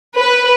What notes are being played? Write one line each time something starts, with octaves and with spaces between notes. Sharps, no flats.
B4